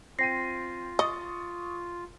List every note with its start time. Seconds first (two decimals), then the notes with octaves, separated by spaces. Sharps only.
0.19 C4 F4 G5 A#6 C7 D#7
0.99 D#5 C#6 D#6 A6